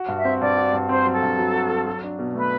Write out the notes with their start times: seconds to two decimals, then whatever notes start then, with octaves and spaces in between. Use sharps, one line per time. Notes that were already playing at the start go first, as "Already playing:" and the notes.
Already playing: F#4
0.08 G2
0.17 E5
0.25 C4
0.41 G2 D5
0.57 F#4
0.73 G2
0.89 C4 C5
1.06 F#3
1.14 A4
1.23 G2
1.39 F#3
1.54 F#4
1.71 F#3
1.87 F#3
2.04 D4
2.19 B2
2.35 A3 B4